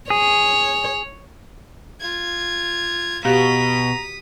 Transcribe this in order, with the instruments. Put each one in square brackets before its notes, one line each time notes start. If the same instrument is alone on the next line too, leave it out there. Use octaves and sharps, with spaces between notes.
[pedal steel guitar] G#4 [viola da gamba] C#5
[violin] F4 G#6
[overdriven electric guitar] B2 [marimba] F#4 G4 F5 [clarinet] A#5 [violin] D#6 B6